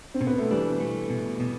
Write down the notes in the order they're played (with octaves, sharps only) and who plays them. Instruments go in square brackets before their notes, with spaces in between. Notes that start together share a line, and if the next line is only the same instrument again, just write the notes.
[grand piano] C4
[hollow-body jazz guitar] B2
[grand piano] B3
A3
[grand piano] E3 G3 [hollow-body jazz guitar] D4
[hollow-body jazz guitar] A3
B2
B2